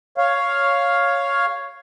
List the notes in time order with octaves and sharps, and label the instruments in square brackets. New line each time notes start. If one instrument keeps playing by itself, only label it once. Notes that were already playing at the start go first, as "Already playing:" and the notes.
[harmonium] C#5 F5